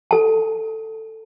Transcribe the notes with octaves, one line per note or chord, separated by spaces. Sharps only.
A4 A5